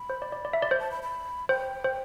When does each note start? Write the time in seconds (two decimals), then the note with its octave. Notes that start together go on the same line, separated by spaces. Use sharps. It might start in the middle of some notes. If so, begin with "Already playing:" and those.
Already playing: B5
0.10 C5
0.22 D5
0.32 D5
0.45 D5
0.53 E5
0.62 D5
0.71 C5
0.79 A5
0.91 B5
1.03 B5
1.49 C5 G5
1.84 C5